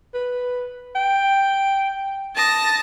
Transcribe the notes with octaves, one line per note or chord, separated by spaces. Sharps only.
B4
G5
A5 D#6 A#6